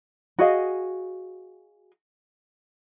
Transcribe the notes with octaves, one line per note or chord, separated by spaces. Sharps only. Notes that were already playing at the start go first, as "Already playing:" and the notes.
F#4 G#4 D#5 F5